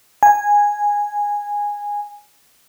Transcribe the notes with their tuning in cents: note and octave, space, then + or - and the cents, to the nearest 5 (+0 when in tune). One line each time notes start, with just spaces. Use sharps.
G#5 -10